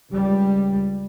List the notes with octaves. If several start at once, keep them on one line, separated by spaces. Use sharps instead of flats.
C#2 G3